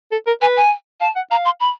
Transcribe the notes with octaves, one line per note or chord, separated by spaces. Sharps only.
A4
A#4
B4 G#5
G#5
F5 A5
F#5
F5 A#5
C6
B5